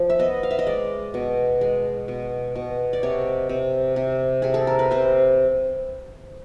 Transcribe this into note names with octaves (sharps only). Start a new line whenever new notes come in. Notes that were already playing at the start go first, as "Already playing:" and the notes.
Already playing: F3
E5
B3 D#5
F5
E5
D#5
G#3 D5
B2
G#3
B2
B2
D5
C3 C#5
C3
C3
C3 G#4
A4
A#4
B4
C3 C5